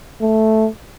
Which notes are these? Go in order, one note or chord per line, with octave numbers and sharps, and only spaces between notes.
A3